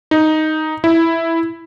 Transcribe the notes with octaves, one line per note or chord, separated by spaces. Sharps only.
D#4
E4